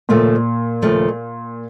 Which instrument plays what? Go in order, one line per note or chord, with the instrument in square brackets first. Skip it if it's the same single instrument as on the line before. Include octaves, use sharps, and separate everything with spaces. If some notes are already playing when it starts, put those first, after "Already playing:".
[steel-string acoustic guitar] D#2 C#3 F3 A3 [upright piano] A#2
[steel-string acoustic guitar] D#2 C#3 F3 A3